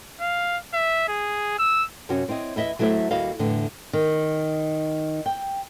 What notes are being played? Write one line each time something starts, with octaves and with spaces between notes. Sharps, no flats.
F5
E5
G#4
E6
F#2 C3 C4 C#4 F#4
C4 E4 C#5 D#5
E2 E4 D#5 E5
F#3 A3 E4 A4 C5 E5
D#2 G3 E4 F#4 D#5 F5
E2 A2 D3
D#3
G5